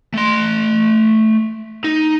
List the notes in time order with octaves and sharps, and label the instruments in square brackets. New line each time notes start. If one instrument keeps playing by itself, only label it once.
[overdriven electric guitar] A3 C6
D#4